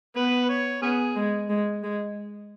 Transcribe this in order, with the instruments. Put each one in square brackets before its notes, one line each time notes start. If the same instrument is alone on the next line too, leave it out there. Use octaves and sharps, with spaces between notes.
[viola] B3 [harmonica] B4
[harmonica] C#5
[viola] B3 [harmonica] C#4 G#4
[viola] G#3
G#3
G#3